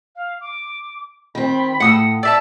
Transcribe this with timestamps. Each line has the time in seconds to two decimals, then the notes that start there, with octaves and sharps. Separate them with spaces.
0.16 F5
0.41 D6
1.35 D#3 C4 B5
1.80 A2 F#5 D#6 E6
2.23 D5 E5 A5 E6